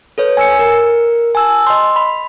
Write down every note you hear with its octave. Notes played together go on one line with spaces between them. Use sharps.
A4 B4 C#5
G#5 E6 C#7
A#4
G#5 A5 E6
D#5 C6
B5